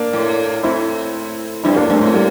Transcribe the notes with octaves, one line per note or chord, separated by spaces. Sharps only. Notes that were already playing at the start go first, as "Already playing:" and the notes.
Already playing: A#3 D4
A2
A2 C4 E4
G2 C4 E4
A2 A#3 D4
G2 A3 C4
A2 A3 C4
G3 A#3